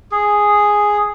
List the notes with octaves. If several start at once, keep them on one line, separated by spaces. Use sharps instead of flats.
G#4